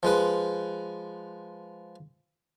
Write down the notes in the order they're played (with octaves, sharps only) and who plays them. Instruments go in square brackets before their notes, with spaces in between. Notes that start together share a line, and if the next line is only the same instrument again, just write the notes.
[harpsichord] F3 G#3 B4